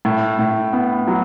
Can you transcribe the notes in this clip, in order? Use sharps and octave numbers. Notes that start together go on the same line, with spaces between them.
A2
A2
B3
F#3